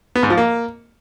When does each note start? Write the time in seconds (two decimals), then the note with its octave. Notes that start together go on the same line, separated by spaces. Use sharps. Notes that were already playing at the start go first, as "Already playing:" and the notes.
0.15 B3
0.23 G#2
0.30 F3
0.38 A#3